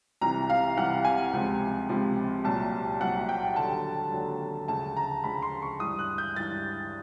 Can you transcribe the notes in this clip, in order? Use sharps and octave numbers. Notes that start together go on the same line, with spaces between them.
C2 C3 E3 A#5
F5
C2 C3 E3 F#5
G#5
C#2 C3 F3
C#2 C3 F3
C2 A#2 F#3 A5
C2 A#2 F#3 F#5
G5
D#2 D3 F#3 A5
D#2 D3 F#3
D2 C#3 F3 A5
A#5
D2 C#3 F3 B5
C6
C#6
G2 E3 D#6
F#6
G6
G2 E3 A6